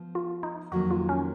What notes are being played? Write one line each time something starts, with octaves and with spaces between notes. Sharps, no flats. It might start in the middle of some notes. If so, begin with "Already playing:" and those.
Already playing: F3 B3
F4
D#4
F2 D#3 F#3 A#3 F#4
F4
C#4